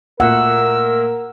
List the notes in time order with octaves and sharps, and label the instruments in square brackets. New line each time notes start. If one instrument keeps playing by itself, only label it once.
[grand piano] A#2 A3 A#3 [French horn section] A#4 [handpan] F#5 [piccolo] E6